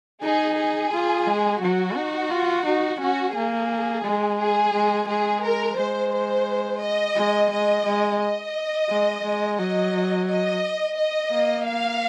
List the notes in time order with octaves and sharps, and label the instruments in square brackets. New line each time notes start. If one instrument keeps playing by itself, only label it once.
[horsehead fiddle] D#4 [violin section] G#4
[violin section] G#4
[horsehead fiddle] F4
G#3
[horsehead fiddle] F#3 [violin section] F#4
[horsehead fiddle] D#4
F4
D#4
[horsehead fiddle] C#4 [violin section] F#4
[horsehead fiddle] A#3 [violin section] G#4
[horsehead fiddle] G#3
[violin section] G#4
[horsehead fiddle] G#3
[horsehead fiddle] G#3 [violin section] G#4
[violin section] A#4
[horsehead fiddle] G#3 [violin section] C5
[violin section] C5
D#5
[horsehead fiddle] G#3
[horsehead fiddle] G#3 [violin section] D#5
[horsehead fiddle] G#3
[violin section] D#5
[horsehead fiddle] G#3
G#3
[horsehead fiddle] F#3 [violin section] D#5
[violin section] D#5
D#5
[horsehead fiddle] A#3
[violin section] F5